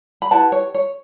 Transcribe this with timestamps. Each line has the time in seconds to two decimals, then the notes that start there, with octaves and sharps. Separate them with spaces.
0.22 B5
0.31 E4 G4 B4 F#5 A5
0.52 C#5
0.74 C#5